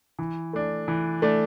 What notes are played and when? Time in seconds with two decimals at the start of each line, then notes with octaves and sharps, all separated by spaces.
0.19 E3
0.53 A3 D4
0.88 E3
1.22 A3 D4